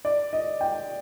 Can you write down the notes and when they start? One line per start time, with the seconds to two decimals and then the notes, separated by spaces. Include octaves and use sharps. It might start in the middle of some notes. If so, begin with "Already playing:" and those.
0.05 D5
0.33 D#5
0.61 G5